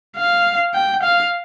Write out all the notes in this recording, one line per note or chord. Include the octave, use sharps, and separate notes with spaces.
F5
G5
F5